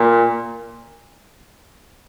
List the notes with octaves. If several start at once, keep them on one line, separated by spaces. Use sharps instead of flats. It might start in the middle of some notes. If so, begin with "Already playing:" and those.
Already playing: A#2